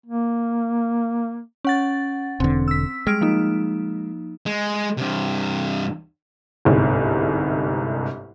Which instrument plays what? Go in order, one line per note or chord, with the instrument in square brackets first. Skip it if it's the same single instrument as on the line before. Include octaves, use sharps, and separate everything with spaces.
[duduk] A#3
[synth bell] C#4 F#5 A6
[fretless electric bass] E1 D3 [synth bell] C4
[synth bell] E6 B6
[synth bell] G3 F6 D7 [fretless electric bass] G#3
[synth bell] F3 A#3 D#4
[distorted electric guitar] G#3
G2 C3
[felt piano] G1 C2 G#2